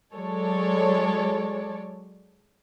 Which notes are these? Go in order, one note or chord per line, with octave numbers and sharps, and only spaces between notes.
F#3 G#3 A4 C#5 D5